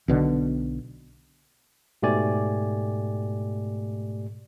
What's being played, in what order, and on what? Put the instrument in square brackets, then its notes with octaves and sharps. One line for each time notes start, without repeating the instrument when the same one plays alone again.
[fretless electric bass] B1 B2 D3
[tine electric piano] G#2 B2 A3 G4 D5 G#5